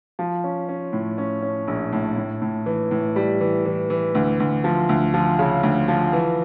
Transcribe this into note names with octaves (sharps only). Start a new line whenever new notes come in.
F3
C#4
C#4
A2
C#4
C#4
A#1
A2
A2
A2
E3
A2
G3
E3
E3
E3
D2
D2
F3
D2
F3
C#3
D2
F3
E3